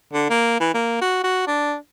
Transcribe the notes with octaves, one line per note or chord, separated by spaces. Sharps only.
D3
A#3
E3
A#3
F#4
F#4
D4